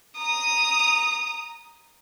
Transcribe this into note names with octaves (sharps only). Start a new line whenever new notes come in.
A#5 D#6